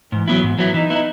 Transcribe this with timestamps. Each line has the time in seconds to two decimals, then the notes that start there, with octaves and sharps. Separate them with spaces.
0.12 G#2 E3
0.28 F#3 B3 E4
0.44 G#2
0.59 F#3 B3 E4
0.74 E3 D#4
0.90 B3 E4